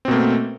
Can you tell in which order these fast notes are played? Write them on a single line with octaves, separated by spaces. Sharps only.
C4 B2 A#3 A3